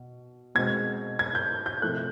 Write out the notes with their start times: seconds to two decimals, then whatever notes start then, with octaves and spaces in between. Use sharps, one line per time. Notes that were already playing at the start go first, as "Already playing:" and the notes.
Already playing: B2
0.55 B2 G#3 C4 G#6
1.19 G#6
1.35 G6
1.66 G6
1.82 C3 F3 A3 F#6